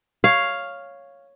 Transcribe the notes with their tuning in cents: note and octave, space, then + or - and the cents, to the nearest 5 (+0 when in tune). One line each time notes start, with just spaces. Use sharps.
C#5 +0 F5 +0